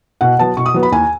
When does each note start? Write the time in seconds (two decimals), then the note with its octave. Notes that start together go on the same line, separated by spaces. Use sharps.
0.21 B2 F#5
0.39 F#3 B3 A5
0.57 B2 C#6
0.66 D#6
0.74 F#3 B3
0.83 B5
0.92 D#2 G#5